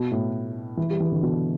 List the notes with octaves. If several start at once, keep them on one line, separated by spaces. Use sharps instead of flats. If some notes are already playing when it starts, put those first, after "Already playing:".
Already playing: B2
A2
E3
G3
E3
D3
B2